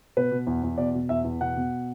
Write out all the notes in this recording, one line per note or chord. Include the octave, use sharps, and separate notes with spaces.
B2 B4
B2
E2
E2
B2 D5
B2
E2 E5
E2
B2 F#5
B2